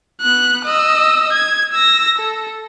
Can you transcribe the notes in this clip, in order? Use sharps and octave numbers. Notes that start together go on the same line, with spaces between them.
B3 F#6
D#5 E6
G#6
E6 A#6
A4